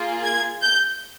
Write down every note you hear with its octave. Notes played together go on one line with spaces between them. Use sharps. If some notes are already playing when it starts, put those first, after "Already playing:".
Already playing: A#3 F4 G#4
G#6
G6